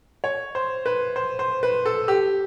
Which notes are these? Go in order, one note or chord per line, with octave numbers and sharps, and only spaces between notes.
C#5
C5
B4
C5
C5
B4
A4
G4